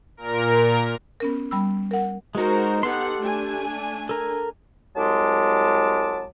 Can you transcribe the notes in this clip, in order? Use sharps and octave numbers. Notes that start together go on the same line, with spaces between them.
A#2 A#4
B3 C#4 A#4
G3 B5 E6
A#4 F#5
G#3 D#4 F#4 A#4 C5
B3 D#4 G4 A4 F#5 C6
A3 D4 G#5
A4 A#4
C2 F#3 G#3 A5 D6